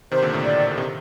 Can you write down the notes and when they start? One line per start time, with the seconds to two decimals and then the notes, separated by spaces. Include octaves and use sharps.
0.11 C3 D#3 C5
0.22 A#2 D3
0.33 A2 C3
0.45 D5
0.71 D3
0.78 C3 D#3